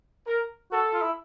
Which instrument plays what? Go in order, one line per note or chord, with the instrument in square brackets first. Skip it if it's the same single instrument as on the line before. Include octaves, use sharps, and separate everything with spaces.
[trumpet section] A#4
[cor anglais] F#4 [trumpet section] A4
[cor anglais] F4
E4